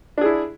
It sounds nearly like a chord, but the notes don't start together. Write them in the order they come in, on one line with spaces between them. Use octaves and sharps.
D4 G#4 E4